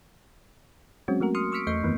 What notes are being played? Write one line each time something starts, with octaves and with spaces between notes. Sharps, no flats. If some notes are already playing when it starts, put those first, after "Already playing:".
F#3 G#3 C4 C#4 F#4
F#3 A3 A#3 F#4 A#4
C6 D#6 F6 C#7
C#6 E6 F6 B6 C#7 D7
E2 A3 D#5 C#6 G6 C7
F#2 D#3 E3 A#3 B3